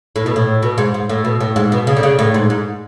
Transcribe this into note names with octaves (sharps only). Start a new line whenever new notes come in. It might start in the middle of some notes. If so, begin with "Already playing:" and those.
A2
B2
A2
B2
G#2
G#2
A2
B2
A2
G#2
B2
C#3
D3
C#3
A2
G#2
G#2